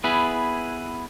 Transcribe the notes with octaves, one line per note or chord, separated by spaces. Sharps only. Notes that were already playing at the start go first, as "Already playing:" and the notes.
B3 E4 G#4 B4